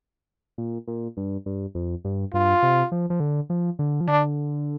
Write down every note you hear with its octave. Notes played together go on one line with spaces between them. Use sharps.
A#2
A#2
G2
G2
F2
G2
G2 F4
C3
F3
F3
D3
F3
D3
F3
D3 D4